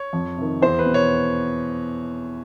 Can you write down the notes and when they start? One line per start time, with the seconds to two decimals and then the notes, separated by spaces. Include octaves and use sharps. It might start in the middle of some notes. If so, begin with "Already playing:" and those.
Already playing: C#5
0.13 F2
0.38 C3 D#3
0.62 E2 C5
0.79 B4
0.86 B2
0.94 C#5